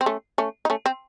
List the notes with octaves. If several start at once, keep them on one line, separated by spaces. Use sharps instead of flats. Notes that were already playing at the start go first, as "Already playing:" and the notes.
C4
A3 C#4
A3 C#4
D#4
A3 C#4
C4